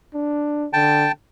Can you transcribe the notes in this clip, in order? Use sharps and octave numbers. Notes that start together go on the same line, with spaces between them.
D4
D3 G5 A5